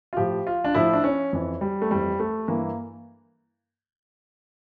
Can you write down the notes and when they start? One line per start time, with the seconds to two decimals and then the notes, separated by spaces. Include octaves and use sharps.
0.13 F4
0.17 A2 F3 G4
0.47 F4
0.64 D4
0.75 A2 F3 E4
0.93 D4
1.04 C#4
1.33 F2 E3
1.61 G3
1.82 A3
1.91 F2 E3 G3
2.20 A3
2.48 G2 E3 A#3